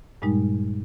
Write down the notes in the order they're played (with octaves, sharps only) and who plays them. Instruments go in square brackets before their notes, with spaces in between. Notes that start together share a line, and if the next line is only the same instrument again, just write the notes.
[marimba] G2 A#2 G3 G#3 D#4